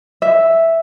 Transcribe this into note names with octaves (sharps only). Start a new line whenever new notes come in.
E5